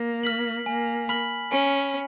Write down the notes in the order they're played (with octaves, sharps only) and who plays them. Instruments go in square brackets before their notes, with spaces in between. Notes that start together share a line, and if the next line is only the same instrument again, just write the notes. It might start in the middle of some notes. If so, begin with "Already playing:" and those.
Already playing: [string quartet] A#3
[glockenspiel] F6 B6 F#7
[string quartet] A#3 [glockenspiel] G#5
[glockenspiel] B5 F6 B6 F#7
[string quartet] C#4 [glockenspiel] G#5